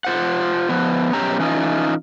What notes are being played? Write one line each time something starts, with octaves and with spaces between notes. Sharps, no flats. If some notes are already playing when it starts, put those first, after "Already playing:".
F4 C5 F#5
F3 B3
F#2 B2 C#4 G4 A#5
E3 C#4 D#4 F4